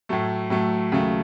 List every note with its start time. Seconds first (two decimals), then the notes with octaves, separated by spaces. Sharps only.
0.09 A2 F#3 A3
0.50 A2 F#3 A3
0.92 D#2 C#3 F#3 A3